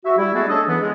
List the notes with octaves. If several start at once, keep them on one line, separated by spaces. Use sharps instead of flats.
F#4 E5
G3 E4
G#3 A3 B3 F#4 G#4 A4
C#4 D4 G#4 A4 D#5
E3 B3
G#3